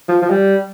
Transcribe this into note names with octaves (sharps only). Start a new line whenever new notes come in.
F3
F3
G3